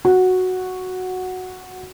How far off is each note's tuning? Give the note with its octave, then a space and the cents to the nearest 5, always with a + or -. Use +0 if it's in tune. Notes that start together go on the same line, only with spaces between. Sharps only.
F#4 -5